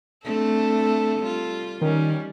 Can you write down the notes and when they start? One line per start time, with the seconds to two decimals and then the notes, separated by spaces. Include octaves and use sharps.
0.25 A3 C4 D4 A4
1.20 G3 F4
1.81 D#3 G3 C#4